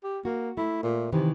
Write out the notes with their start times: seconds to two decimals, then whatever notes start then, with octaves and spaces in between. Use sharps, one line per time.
0.04 G4
0.25 A#3 F#4
0.57 A3 E4
0.83 A#2
1.12 C3 D#3 E3